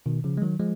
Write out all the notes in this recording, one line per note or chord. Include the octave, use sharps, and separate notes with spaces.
B2 D#3
C#3 F3
G#3
D#3 F#3
F3 G#3